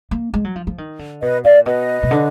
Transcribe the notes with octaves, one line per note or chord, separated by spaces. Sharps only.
A#3
G#3
F#3
F3
F3
D#3
D3
B2 B4 D#5
A#2 D5 F5
B2 B4 D#5
B2
D3